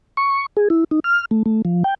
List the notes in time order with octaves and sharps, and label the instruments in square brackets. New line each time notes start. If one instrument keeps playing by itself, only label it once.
[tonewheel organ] C#6
G#4
E4
D#4
F6
A3
A3
F3
G5